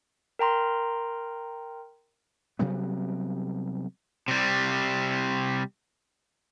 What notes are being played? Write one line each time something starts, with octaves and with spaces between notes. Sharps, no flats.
A#4 G5 A#5 C6
C3 F#3 G3 B3
C3 G3